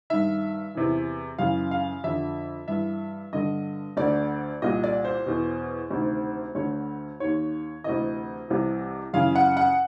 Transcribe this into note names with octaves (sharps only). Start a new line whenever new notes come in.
G2 D#3 E5
E2 C3 E3
F#2 C#3 E3 F5
F5
F2 D3 E5
G2 E3 E5
G2 D3 D#5
D2 D3 D5
C2 A#2 D#5
D5
C5
E2 B2
D2 C3 D#3
D2 D3 C#5
D#2 D#3 C#5
D2 C3 E3 D#5
C2 C3 E3
F#2 C#3 E3 F5
F#5
F#5